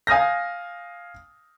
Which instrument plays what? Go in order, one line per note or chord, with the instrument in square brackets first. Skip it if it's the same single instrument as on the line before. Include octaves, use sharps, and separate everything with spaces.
[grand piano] F5 G#5 D#6 F6 G6 A#6